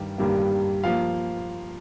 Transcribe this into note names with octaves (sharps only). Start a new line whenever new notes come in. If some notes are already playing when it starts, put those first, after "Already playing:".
Already playing: G2 D#3 G3
G2 D#3 G3 A#3
F3 A#3 F5